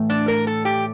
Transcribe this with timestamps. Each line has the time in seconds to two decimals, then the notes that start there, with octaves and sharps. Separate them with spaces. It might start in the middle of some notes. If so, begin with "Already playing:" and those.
Already playing: A2 E3 A3
0.10 D4
0.28 A#4
0.47 A4
0.65 G4